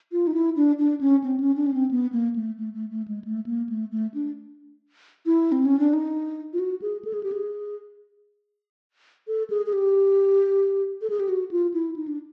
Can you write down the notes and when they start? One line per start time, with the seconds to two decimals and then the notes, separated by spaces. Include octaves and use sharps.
0.12 F4
0.27 D#4
0.34 E4
0.56 D4
0.79 D4
1.01 C#4
1.24 C4
1.40 C#4
1.56 D4
1.66 C#4
1.74 C4
1.91 B3
2.12 A#3
2.36 A3
2.58 A3
2.74 A3
2.90 A3
3.08 G#3
3.25 A3
3.46 A#3
3.69 A3
3.91 A3
4.14 D4
5.26 E4
5.52 C4
5.65 C#4
5.79 D4
5.93 D#4
6.53 F4
6.59 F#4
6.82 G#4
7.05 A4
7.14 G#4
7.23 G4
7.32 G#4
9.28 A4
9.50 G#4
9.66 G#4
9.73 G4
11.02 A4
11.10 G#4
11.20 G4
11.29 F#4
11.51 F4
11.74 E4
11.96 D#4
12.08 D4